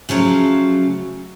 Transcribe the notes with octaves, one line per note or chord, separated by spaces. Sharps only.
C#3 F3 F#3 A3